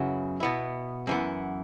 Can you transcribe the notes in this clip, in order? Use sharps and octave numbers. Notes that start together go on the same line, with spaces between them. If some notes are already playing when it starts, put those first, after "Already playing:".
Already playing: F#2 C#3 F#3 B3 E4
B2 B3 E4
F#2 E3 B3